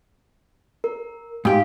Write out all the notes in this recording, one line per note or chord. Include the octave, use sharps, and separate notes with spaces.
A#4
G#2 G4 F5